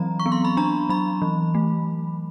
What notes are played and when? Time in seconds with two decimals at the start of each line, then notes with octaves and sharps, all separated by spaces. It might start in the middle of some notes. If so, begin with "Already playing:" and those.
Already playing: E3 F#3 C4 A#5
0.20 C#6
0.26 B3
0.32 C6
0.45 B5
0.57 D4 A#5
0.89 F#3 B5
1.22 E3
1.55 A3